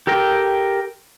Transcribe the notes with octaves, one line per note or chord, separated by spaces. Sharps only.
G4 A4 A#4 G5